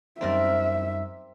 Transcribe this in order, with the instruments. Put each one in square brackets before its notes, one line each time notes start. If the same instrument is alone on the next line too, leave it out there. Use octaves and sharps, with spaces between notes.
[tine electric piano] F#2 G3 D#4 [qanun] C4 A#4 D5 [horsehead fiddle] E5